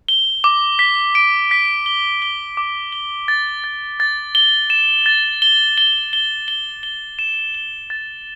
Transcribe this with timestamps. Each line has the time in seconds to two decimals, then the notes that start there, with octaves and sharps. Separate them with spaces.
0.08 G7
0.44 D6
0.79 B6
1.15 D7
1.51 B6
1.86 G7
2.22 G7
2.57 D6
2.92 G7
3.28 A6
3.64 A6
4.00 A6
4.35 G7
4.70 E7
5.06 A6
5.42 G7
5.78 G7
6.13 G7
6.48 G7
6.83 G7
7.19 E7
7.54 G7
7.90 A6